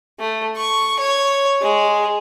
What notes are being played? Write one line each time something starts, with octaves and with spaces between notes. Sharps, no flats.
A3
C#6
C#5
G#3